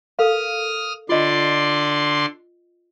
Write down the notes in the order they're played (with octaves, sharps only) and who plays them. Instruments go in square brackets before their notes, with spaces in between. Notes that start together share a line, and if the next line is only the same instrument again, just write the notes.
[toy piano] A4 A#4 F5 [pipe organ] D#6 F6
[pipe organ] D3 D5 C6 [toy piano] F4 D#5